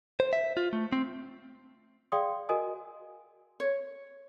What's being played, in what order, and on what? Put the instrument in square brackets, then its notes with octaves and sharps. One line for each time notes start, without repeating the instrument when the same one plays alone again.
[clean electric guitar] C5
E5
F4
A3
C4
[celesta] G#4 D5 F5 G5 C6 D#6
F#4 A#4 D#5 G#5 D#6
[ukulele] C#5